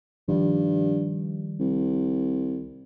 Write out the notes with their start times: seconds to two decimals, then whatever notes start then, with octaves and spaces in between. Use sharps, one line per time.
0.28 G2 D#3 F3 G3
1.60 C2